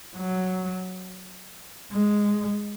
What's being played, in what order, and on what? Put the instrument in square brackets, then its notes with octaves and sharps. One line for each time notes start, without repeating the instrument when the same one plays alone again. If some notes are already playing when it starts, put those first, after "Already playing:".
[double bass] F#3
G#3